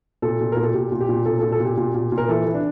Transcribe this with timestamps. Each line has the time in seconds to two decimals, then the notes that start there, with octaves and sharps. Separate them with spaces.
0.22 A#2 A4
0.40 A#2
0.52 A#2 A#4
0.64 A4
0.74 A#2 G4
0.92 A#2
1.01 G4
1.09 A#2
1.26 A#2 A4
1.39 A#2 A4
1.52 A4
1.60 A#2 G4
1.78 A#2
1.94 A#2
2.12 A#2
2.18 A#4
2.28 E3 A4
2.46 E3
2.54 D4